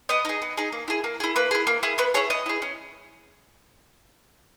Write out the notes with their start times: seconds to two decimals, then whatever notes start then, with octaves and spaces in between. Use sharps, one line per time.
0.09 B3 D#5
0.25 D#4 G#4
0.42 B3
0.57 D#4 G#4
0.72 A#3
0.88 E4 G#4
1.04 A#3
1.20 E4 G#4
1.36 A#3 B4
1.51 E4 G#4
1.67 A#3
1.83 E4 G#4
1.98 B3 B4
2.14 E4 G#4 C#5
2.30 B3 D#5
2.46 E4 G#4
2.62 C#4